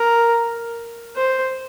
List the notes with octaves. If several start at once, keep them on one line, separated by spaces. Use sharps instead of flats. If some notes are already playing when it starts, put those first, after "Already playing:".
Already playing: A#4
C5